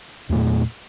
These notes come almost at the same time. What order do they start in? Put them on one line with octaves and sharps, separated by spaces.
E2 A3 A#2